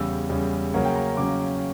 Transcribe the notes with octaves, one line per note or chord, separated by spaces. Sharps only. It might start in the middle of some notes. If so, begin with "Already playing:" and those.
Already playing: E2 C#3 G3 E6
E2 C#3 G3
C#3 F#3 A#3 C#4 F#5
G5
A#5
C#3 F#3 A#3 C#4 D6